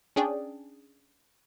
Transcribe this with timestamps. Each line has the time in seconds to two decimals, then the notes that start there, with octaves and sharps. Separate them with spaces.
0.16 C#4 D4 G#4 D5 G5